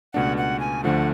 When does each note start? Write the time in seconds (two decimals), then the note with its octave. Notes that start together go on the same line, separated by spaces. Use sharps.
0.14 C#2 B2 A3 D4 F#5
0.37 F#5
0.60 G#5
0.84 D2 D3 F3 A3 F#5